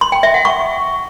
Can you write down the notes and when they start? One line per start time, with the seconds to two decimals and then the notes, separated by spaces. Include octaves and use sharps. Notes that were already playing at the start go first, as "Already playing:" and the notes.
0.01 C6
0.12 G5
0.23 E5
0.34 F#5
0.45 C#6